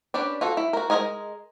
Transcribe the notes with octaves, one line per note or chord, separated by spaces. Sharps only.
C#4 D4 G4 B4 D5
F4 F#4 A4
E4
F#4 A#4
G#3 G#4 A#4 D#5 G#5